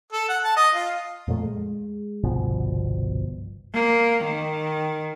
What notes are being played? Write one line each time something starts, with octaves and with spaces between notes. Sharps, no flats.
A4
F#5
A5
D#5
F4
F2 A#2 F3 A3
G#3
G1 C2 B2 F3
A#3
D#3